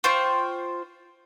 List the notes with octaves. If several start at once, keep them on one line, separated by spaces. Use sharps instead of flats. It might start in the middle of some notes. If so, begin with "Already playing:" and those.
F4 C5 G5 C#6